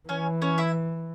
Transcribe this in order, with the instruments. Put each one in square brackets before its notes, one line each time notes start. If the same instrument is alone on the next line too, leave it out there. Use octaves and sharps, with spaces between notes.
[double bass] E3 [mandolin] C#4 C#5
[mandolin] C#4 C#5
E4 E5